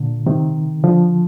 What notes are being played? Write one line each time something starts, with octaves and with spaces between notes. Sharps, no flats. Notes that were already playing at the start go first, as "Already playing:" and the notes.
Already playing: A#2 D3
C3 D#3
D3 F3